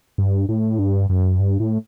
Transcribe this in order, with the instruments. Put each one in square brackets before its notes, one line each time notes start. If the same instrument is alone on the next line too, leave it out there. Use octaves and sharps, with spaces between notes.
[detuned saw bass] G2
A2
G2
F#2
G2
A2